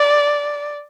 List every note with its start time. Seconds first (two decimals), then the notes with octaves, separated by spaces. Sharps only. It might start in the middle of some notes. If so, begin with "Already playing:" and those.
Already playing: D5